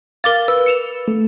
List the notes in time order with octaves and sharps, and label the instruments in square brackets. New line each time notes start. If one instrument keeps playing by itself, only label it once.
[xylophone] A#4 D6 A6 [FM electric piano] F5
[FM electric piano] B4 [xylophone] E6
[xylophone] C#7 E7 F7
[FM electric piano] A3